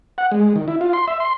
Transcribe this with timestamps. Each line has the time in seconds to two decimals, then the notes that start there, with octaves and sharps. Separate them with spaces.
0.18 F#5
0.31 G#3
0.56 D#3
0.68 E4
0.81 F4
0.93 C6
1.08 E5
1.20 C6